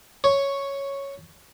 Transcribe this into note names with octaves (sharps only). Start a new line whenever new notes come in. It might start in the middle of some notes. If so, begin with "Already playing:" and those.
C#5